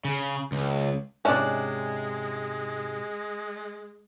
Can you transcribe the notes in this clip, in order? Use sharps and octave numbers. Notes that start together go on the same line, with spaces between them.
C#3
C#2
G#2 C3 G#3 C#4 D4 E4 D5